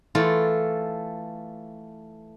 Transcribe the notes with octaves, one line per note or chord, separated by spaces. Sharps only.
E3 A3 F4 A4